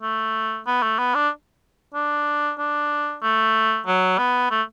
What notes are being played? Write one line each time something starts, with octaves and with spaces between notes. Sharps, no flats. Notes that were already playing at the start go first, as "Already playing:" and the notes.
A3
B3
A3
B3
D4
D4
D4
A3
F#3
B3
A3